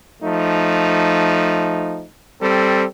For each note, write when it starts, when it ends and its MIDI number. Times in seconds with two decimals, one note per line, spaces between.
0.22 2.05 53
0.22 2.05 57
0.22 2.05 63
2.42 2.85 55
2.42 2.85 60
2.42 2.85 69